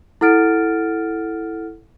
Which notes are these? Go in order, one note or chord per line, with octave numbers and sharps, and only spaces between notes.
E4 A4 F#5 F6 A6 D7